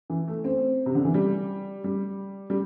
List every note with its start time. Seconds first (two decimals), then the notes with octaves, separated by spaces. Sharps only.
0.10 E3
0.27 A3
0.44 C4
0.86 C3
0.95 D3
1.05 E3
1.14 G3
1.84 G3
2.50 G3